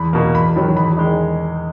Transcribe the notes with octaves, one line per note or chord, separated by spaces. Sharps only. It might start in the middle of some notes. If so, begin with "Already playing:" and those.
Already playing: E2 B5
B2 A#3
E2 B5
D#3 F#3
E2 B5
D#3 G#3 D#4